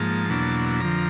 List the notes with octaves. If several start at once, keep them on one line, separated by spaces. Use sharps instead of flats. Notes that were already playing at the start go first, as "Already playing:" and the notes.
Already playing: G#2 F3 A#3 A5
E2 B2 F#3 A#3 D4
F2 D3 F3 A#5